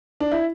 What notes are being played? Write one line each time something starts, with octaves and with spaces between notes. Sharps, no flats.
D4
E4